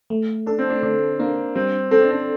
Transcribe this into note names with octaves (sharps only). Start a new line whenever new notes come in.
A3
D4 A4
C4
D4
D3 D4
A#3 D4
G3 C4
C4 A4
D4
C4